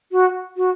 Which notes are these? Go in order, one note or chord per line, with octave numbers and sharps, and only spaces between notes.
F#4
F#4